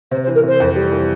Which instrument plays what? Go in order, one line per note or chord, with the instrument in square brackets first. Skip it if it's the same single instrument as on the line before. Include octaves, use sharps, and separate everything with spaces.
[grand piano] C3 [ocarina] C5
[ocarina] C5
[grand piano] E3
[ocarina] A#4
[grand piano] C3 [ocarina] C5
[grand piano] F2
G3
E3